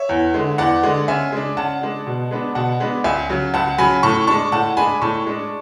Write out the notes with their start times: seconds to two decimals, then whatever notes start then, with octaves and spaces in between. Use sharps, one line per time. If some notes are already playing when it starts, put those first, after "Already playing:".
Already playing: C#5 E5
0.09 E2
0.34 D3 G#3
0.58 E2 D5 F#5
0.83 D3 G#3
1.08 C#3 E5 G#5
1.32 G#3 D4
1.57 C#3 F#5 A5
1.82 G#3 D4
2.07 B2
2.31 G#3 B3 D4
2.55 B2 F#5 A5
2.80 G#3 B3 D4
3.04 C#2 E5 G#5
3.30 C#3 F#3
3.54 C#2 F#5 A5
3.78 C#3 F#3 G#5 B5
4.03 A2 A5 C#6
4.27 G#3 D4 A5 C#6
4.52 A2 F#5 A5
4.77 G#3 D4 G#5 B5
5.02 A2 A5 C#6
5.26 G#3 D4